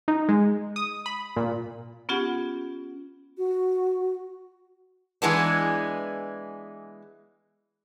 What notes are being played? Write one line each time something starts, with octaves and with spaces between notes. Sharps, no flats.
D#4
G#3
D#6
B5
A#2
B3 C#4 F4 G4 G#4 F#5
F#4
E3 G#3 B3 D4